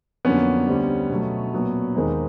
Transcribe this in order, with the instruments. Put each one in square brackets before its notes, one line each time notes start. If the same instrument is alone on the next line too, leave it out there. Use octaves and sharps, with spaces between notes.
[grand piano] F2 D3 F#3 A#3 [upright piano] B3 C#4
[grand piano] D2 D3 G3 C4
B2 F#3 A3
A#2 F#3 B3
D#2 D#3 G#3 C4 D#4